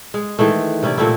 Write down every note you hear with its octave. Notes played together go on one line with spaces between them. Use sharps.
G#3
D#3 E3 G#3 A3
C3 C#4 E4 D5
A#2 A3 C4 E4